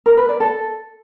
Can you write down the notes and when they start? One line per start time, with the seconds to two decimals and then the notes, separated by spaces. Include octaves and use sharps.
0.06 A#4
0.17 B4
0.29 D5
0.40 A4